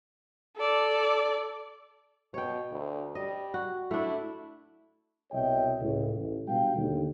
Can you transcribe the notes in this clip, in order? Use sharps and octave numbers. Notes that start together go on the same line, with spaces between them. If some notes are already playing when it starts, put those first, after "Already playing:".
A4 D5
B2 C#5 G5
D2
G3 D#5
F#4
A3 D4 E4
C2 B2 C#5 D#5 E5 G5
C#2 A2
A1
B2 G3 D4 F5 G5
D#2 D3 A3